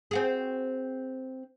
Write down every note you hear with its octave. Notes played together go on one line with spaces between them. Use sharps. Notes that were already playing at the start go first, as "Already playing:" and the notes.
C4 F#4 G#4